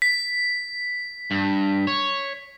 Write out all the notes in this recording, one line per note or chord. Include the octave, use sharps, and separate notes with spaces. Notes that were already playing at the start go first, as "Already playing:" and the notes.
B6
G2
C#5